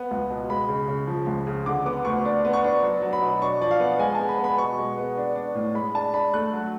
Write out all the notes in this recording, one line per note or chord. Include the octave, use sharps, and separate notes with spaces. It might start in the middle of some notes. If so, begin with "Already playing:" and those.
Already playing: B3
C#2
B2
G#3 B5
C#3
C#3
F3
C#2
C#3
D3 D6
B3 D6
D2 C#6
D4
B3
C#6
D4
F#3
F#3
B5
B2
D4 C#6
F3 D5
F5
B3
G#3 G#5
B3 A5
B5
B3
B5
B2 C#6
G#3
B3
D4
D4
A2
G#3 B5
D4 A5
D4 B5
A3 F#6
F#3